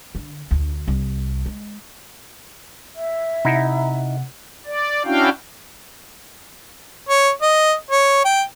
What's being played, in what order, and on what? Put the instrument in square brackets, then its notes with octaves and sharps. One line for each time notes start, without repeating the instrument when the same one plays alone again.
[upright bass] D3
D2
C2
G#3
[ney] E5
[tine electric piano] C3 F#5 [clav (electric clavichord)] D#4 E4
[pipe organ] D5
C#4 D4 E4 F#4 F5 G5
[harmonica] C#5
D#5
C#5
G5